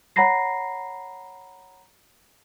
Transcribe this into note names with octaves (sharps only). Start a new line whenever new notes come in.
C#5 F#5 A#5 B5 A#6 C7